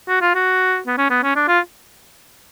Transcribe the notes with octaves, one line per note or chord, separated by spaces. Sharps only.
F#4
F4
F#4
B3
C#4
B3
C#4
D4
F4